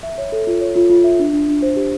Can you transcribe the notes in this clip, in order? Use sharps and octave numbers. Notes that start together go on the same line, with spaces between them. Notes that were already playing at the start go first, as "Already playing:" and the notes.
E5
C#5
A4
F4
C#5
F4
F4
E5
D4
D4
D4
C5
G4